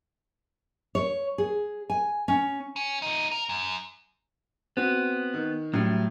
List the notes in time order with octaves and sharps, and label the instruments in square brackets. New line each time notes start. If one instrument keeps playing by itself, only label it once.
[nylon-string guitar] C#5
G#4
G#5
C#4
[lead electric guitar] C#4
A3 D#4
A#4
F#2
[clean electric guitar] B3 [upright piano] C4 F#4
[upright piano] D#3
[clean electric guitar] A2 [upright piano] F#3 G3 E4